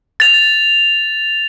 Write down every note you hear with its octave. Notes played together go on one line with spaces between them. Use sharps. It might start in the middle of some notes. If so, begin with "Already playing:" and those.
A6 F7